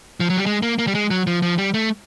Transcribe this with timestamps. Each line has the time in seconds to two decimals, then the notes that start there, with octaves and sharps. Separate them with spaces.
0.20 F3
0.30 F#3
0.37 G3
0.46 G#3
0.63 A#3
0.79 A#3
0.87 G3
0.95 G#3
1.10 F#3
1.27 F3
1.42 F3
1.58 G3
1.74 A3